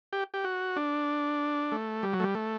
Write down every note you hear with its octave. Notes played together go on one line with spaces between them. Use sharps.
G4
G4
F#4
D4
A3
G3
F#3
A3
G3
A3